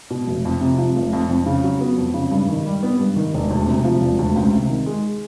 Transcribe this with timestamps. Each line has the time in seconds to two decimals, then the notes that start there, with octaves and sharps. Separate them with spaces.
0.11 B2
0.27 F1
0.45 F2
0.61 C3
0.78 F3
0.96 F1
1.13 F2
1.29 F2
1.46 C#3
1.64 F#3
1.81 B3
1.98 F2
2.14 C#3
2.31 G2
2.49 D#3
2.66 G3
2.83 B3
2.99 G2
3.16 D#3
3.34 E1
3.51 D2
3.67 C3
3.84 F3
4.01 E1
4.19 D2
4.36 C#2
4.52 C3
4.69 D#3
4.86 G#3